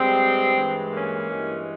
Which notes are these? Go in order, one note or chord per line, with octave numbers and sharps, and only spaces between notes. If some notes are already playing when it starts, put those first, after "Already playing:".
Already playing: G2 G3 G#3 C4
G2 E3 G#3
A#3 C#4
G2 E3 G#3